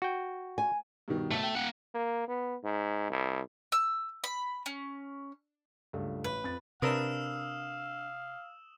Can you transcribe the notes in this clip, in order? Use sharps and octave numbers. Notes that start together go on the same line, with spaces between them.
F#4 G5
G#5
G2 B2 D#3
B1 A3
G5
A#3 F#5
A#3
B3
G#2
C2
E6
B5
C#4
C#2 G2 A3
A1 B4
F2 A6
C3 D4 A#4 B4 F5 D#6 E6 E7